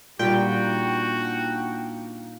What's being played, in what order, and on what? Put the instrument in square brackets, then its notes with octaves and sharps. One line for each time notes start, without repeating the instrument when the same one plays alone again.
[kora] A#2 G3 [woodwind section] A#3 D4 D#4 [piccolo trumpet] F#4 [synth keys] G5